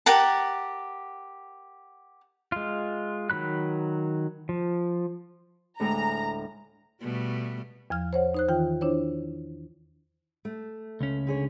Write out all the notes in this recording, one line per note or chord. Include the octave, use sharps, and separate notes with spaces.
G4 A#4 F#5 A5
G#3 F4
D#3 F#3 B5 F#6
F3
D2 A2 G#3 A#5
B2 G3 A3
E2 F3 F6
C5 C#5 F#5
D#4 C5 F#6
D#3 E3 F4 G5
D4 E4 C5 C#5
A3
C#2 C#4
D3 G#4 C#5